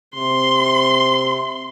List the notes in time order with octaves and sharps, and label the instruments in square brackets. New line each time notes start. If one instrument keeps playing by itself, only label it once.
[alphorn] C3 [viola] C6